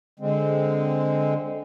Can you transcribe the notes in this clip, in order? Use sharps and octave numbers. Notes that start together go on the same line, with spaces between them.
D3 G#3 C4